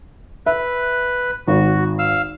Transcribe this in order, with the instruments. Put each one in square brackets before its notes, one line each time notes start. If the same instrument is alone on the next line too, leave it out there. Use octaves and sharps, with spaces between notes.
[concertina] B4 [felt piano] E5
[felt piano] G#1 [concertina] F#4
[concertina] F5 E6